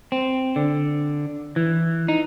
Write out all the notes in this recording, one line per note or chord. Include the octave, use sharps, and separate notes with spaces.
C4
D3
E3
D#4